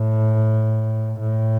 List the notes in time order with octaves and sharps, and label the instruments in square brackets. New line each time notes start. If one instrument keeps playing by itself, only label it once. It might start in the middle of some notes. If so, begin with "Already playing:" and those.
Already playing: [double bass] A2
A2